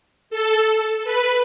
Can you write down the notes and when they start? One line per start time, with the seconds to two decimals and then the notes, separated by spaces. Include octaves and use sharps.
0.30 A4
1.04 B4